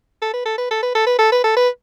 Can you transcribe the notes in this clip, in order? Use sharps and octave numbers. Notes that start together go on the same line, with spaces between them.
A4
B4
A4
B4
A4
B4
A4
B4
A4
B4
A4
B4